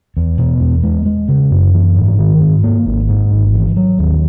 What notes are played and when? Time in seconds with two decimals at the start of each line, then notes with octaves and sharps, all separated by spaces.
0.17 E2
0.38 B2
0.61 E2
0.83 G#3
1.06 G#3
1.28 C#3
1.51 F#2
1.74 E3
1.97 G#2
2.19 D#3
2.41 G#2
2.64 A#3
2.86 G#1
3.09 G#2
3.31 G#1
3.54 E3
3.76 F#3
3.99 D#2